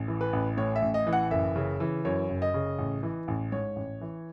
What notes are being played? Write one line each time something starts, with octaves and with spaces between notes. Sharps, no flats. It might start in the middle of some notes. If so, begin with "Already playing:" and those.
Already playing: A1
E3
B4
A1
A2 C#5
E5
A1
D#5
E3
F#5
F#1 E5
C#3
E3
F#2 C#5
F#1
D#5
C#3
A1
E3
A1
G#2 C#5
A1
E3